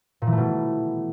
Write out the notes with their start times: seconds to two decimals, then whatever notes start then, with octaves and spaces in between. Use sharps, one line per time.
0.22 A#2
0.27 E3
0.32 A3
0.37 B2